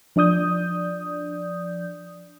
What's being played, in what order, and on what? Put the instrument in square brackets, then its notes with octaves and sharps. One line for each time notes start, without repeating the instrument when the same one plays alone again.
[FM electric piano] F3 D4 D5 D#6 G6